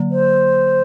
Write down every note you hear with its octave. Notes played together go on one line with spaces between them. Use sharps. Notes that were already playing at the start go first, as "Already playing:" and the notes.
Already playing: D3 F#3 A#3
C5